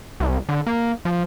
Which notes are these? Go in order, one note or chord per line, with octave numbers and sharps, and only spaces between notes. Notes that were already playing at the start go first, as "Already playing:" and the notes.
C2
D3
A#3
F3